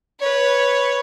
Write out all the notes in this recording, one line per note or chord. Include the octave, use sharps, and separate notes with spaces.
B4 C#5